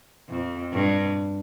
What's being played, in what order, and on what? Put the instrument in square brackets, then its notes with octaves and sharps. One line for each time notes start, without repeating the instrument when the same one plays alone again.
[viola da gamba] F2
G2